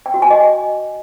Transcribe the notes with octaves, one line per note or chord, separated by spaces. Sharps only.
G5
F#4
G#5
D#5